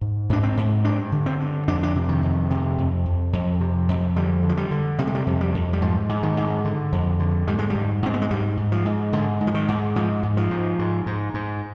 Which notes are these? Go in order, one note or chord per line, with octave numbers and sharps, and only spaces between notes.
G#2
G#2 D4
C4
G#2
G2 D4
D3
C4
G2
F2 D4
D4
C3
D#3
F2
C3
F2
F2
F2
C3
F2
D3 G3
D3
F3
G3
D3
C3 G3
G#3
G3
F2
G3
F2
G3
G#2 F3
G#2
D#3
G#2
D3
F2
D3
G#2 G3
G#3
G#2 G3
G#2 C4
B3
G#3
G#2 G3
G#2
F3
G#2
G#2 D3
G#2
F3
D#3
G#2
G#2 F3
G#2
F3
G#2
G#2
G#2
G#2